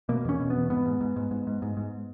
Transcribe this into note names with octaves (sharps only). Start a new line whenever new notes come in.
B2 A#3
E2 C#4
B2
B3
E2
G#2 B3
G#2
G#2
G#2
G#2
G#2
G#2
G#2